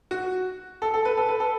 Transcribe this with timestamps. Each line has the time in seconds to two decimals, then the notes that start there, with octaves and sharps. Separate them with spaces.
0.11 F#4
0.82 A4
0.94 A4
1.05 B4
1.17 A4
1.29 B4
1.40 A4